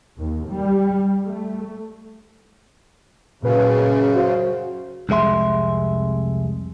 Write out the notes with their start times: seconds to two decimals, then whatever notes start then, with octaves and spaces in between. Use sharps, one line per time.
0.18 D#2
0.48 G3
1.26 A3
3.43 F#2 A#2 C#3 B4 F5
4.15 F#4 C5 F5
5.09 C2 F2 G#3 E5 C6